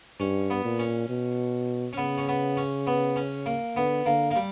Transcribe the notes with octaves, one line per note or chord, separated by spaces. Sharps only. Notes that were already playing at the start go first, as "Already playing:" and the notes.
G2 C#4
B3
A#2
C#4
B2
C#4
C#3 B3
C#4
B3
C#4
B3
C#4
A#3
D3 B3
D3 A#3
A#3
G3